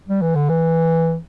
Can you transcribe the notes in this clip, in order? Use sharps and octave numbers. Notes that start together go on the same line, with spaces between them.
G3
E3
D3
E3